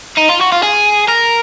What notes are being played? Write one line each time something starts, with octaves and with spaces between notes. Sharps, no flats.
D#4
F4
F#4
F4
G#4
A#4